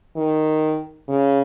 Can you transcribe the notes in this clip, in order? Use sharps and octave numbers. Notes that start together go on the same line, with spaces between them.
D#3
C#3